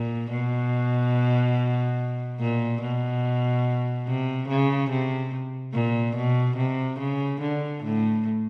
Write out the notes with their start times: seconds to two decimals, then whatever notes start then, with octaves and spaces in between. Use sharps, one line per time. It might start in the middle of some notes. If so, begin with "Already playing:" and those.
Already playing: A#2
0.30 B2
2.40 A#2
2.81 B2
4.07 C3
4.49 C#3
4.90 C3
5.73 A#2
6.16 B2
6.57 C3
6.99 C#3
7.41 D3
7.83 A2